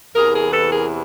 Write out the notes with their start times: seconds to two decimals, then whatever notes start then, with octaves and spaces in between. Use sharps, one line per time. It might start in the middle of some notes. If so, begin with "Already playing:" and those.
0.15 E2 C3 E3 G#4 A#4
0.35 G#4 A#4
0.52 A4 B4
0.72 G#4 A#4